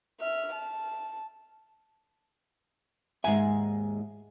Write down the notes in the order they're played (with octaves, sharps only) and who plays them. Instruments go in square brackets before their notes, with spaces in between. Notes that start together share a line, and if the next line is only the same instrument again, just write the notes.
[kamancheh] E5 F6
A5
[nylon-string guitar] D#2 G#2 G#3 [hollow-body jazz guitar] E5 G#5